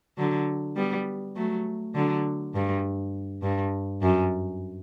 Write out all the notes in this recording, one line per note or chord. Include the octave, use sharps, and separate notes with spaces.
D3 F#3
G3 B3
F#3 A3
D3 F#3
G2
G2
F#2